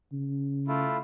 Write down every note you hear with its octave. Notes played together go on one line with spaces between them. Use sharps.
C#3
A3 E4 F4